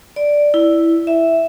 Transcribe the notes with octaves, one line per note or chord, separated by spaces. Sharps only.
D5
E4
E5